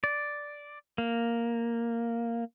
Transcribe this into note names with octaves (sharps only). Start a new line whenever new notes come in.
D5
A#3